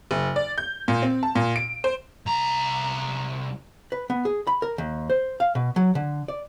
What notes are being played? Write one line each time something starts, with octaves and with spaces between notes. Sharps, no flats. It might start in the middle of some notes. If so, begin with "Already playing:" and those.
F#1
D5
G6
A#2
C4
A5
A#2
D7
C5
C2 A#5
B4
B3
G#4
B5
A#4
D#2
C5
F5
B2
F#3
D3
D5